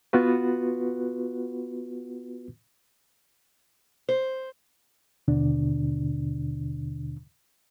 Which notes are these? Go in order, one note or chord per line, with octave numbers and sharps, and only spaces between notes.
B3 F4 F#4 B4
C5
D#2 B2 D3 D4